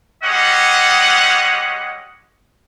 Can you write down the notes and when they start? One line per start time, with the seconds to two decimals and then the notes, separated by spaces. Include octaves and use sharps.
0.24 G3 G#3 C#4 D#5 F#5